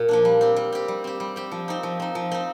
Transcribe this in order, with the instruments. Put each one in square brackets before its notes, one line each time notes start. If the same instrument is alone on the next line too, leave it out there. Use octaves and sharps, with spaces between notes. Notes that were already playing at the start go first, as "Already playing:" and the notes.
Already playing: [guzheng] A#2
F3 A#3 D4
G3
C4 G4
G3
C4 G4
G3
C4 G4
G3
C4 G4
F3
C4 D#4
F3
C4 D#4
F3
C4 D#4